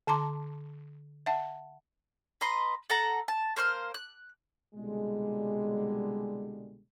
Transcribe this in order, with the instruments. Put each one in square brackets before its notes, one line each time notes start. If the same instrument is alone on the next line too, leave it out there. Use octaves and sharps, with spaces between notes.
[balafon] D3 A5 A#5 C6 D6
E5 F#5 A5
[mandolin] B4 D#5 A#5 C6
A4 F#5 A#5
A5
A#3 C5 C6 F6
F#6
[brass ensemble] C2 B2 D3 G3 G#3